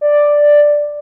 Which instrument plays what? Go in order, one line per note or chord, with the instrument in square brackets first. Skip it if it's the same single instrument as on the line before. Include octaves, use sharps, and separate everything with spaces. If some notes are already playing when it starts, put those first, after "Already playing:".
[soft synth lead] D5